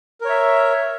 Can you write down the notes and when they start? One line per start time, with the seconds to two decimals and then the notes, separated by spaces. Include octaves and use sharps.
0.21 A#4
0.25 C#5
0.29 E5